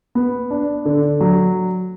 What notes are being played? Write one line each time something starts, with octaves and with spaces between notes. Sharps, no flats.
B3
D4
D3
F#3